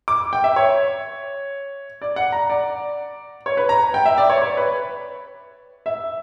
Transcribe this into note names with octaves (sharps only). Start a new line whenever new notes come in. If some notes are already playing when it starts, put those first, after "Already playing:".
D6
G5
E5
C#5
D5
F#5
A#5
D5
C#5
B4
A#5
G5
E5
D5
C#5
C#5
B4
E5